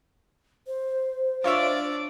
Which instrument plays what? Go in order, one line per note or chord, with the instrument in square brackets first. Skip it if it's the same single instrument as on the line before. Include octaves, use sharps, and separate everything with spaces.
[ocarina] C5
[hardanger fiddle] D4 D5 [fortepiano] F4 C#5 E5